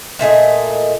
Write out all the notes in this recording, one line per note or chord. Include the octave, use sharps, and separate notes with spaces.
A#2 A3 G#4 D#5